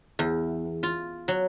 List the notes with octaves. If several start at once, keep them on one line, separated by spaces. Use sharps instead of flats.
E2
F4
F#3